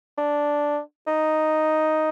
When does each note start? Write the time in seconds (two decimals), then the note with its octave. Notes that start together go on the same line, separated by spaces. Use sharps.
0.18 D4
1.07 D#4